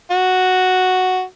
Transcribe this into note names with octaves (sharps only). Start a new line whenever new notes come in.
F#4